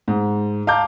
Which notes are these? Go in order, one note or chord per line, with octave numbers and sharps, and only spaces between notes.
G#2
F5 A5 A#5 D6 G6